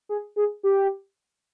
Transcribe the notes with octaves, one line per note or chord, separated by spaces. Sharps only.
G#4
G#4
G4